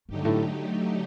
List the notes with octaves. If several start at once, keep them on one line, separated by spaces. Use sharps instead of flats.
G2 D3 F#3 A3 D#4 G4
A2